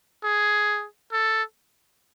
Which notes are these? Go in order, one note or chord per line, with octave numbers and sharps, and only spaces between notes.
G#4
A4